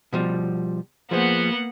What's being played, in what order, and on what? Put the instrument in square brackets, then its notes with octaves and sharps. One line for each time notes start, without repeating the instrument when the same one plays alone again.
[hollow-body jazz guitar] B2 F3 G3
[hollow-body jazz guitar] F3 G#4 C5 [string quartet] A#3 B3 F#5